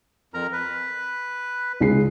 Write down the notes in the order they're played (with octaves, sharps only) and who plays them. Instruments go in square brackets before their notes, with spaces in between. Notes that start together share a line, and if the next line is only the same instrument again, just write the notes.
[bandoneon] F2 A#4 A#5
B4
[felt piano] C#2 G#3 C7